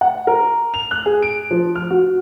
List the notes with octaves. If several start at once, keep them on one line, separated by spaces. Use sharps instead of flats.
F#5
A#4
F7
F#6
G#4
D7
F3
F6
F#4